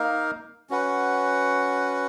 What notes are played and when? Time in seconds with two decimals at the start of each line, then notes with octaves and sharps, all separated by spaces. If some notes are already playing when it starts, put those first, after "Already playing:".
Already playing: A#3 D#4 A#4 F5
0.70 C#4 F#4 B4 F#5